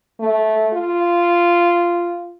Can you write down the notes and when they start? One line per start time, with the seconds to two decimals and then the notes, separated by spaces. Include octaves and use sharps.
0.20 A3
0.73 F4